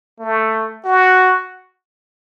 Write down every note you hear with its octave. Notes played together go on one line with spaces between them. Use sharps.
A3
F#4